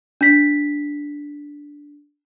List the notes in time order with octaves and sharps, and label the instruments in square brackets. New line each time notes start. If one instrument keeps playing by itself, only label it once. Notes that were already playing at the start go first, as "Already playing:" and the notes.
[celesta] D4 B6